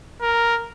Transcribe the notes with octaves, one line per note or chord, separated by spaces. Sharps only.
A#4